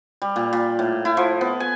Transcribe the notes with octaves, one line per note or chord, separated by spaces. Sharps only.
G3
A#2
A#2
A2
E4
F3
B3
G#5